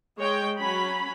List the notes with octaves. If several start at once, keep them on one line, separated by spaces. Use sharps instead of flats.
G#3 C#5 G5
F#3 C#4 B5